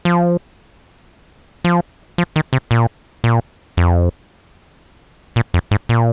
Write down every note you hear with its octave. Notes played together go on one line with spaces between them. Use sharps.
F3
F3
F3
D#3
C3
A#2
A#2
F2
A#2
F2
G#2
A#2